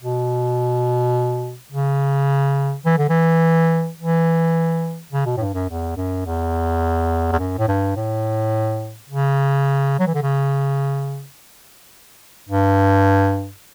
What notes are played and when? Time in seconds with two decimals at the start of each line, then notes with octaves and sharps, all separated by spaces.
0.03 B2
1.72 C#3
2.85 E3
2.98 D3
3.09 E3
3.99 E3
5.12 C#3
5.26 B2
5.37 A2
5.40 G2
5.54 F#2
5.69 E2
5.97 F#2
6.26 E2
7.32 E2
7.38 F#2
7.58 A2
7.68 G2
7.96 A2
9.09 C#3
9.99 F#3
10.07 E3
10.14 D3
10.22 C#3
12.49 G2